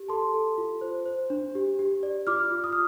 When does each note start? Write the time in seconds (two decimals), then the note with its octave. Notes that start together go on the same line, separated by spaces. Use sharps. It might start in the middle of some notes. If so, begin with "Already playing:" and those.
Already playing: G4
0.09 A4 A5 C6
0.34 A4
0.58 F4
0.81 C5
1.06 C5
1.30 D4
1.55 G4
1.79 G4
2.03 D5
2.27 F4 D6 F6
2.51 F4
2.64 D#6
2.72 F6